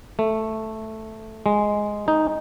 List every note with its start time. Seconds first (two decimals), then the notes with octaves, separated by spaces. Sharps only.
0.19 A3
1.46 G#3
2.08 D#4